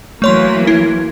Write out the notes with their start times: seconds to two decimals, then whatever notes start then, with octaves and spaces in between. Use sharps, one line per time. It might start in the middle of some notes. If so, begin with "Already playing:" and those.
0.22 E3 F#3 A3 A#3 C#5 C6
0.67 E4